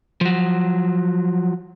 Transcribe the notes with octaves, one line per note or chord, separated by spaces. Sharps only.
F3 F#3